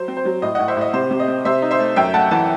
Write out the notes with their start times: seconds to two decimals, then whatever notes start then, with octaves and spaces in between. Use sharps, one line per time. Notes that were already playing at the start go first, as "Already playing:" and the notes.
Already playing: F#3 C5
0.08 C4
0.17 C5
0.25 F#3
0.42 A2 D#5
0.55 A2 D#5 F#5
0.68 C5 E5
0.76 A2 D#5
0.93 C3 C5
1.11 C3
1.20 D#5
1.28 C4
1.45 C3 C5 E5
1.62 D#4
1.71 C5 E5
1.79 A3
1.96 F#2 E5 G5
2.14 A3 F#5 A5
2.31 E3 F#5 A5